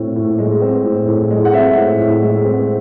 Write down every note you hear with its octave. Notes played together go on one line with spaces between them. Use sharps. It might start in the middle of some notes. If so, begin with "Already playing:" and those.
Already playing: A2 C4
A2
G#3
C4
A2
A2
G#3
F#5
C4 E5
A2
A2
G#3
C4